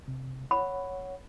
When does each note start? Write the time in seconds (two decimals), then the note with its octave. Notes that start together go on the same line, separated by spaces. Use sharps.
0.08 C3
0.51 C#5 F#5 B5